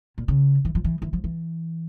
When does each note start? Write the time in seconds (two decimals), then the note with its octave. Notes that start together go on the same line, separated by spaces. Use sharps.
0.18 A#2
0.28 C#3
0.65 E3
0.75 F3
0.84 E3
1.02 E3
1.13 F3
1.24 E3